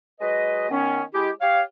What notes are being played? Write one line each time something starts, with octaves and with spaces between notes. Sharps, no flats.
F#3 G#3 B4 D#5
D#3 B3 C#4
G#3 E4 G4
G4 C#5 F5